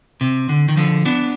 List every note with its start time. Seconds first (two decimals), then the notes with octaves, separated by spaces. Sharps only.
0.21 C3
0.49 D3
0.68 D#3
0.77 D3 F3
1.05 B3 D4